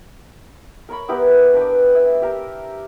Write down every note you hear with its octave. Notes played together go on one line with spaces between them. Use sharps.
A#4 C#5 B5
B3 E4 G4 A#4
D4 B4 G5 D6
E5
G4 A#4